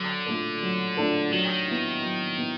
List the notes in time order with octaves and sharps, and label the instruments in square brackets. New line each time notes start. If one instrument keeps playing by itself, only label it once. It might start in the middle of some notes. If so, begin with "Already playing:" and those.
Already playing: [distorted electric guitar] D3 [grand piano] F#3
[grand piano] A3 D4 F4 A4
F#3
A3 D4 F4 A4
[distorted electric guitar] D#3 [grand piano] F#3
[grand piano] B3 E4
F#3
B3 E4